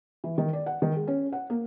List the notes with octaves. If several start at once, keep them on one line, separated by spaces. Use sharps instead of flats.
E3
D#3
D5
F#5
D#3
G#3
C#4
F#5
A#3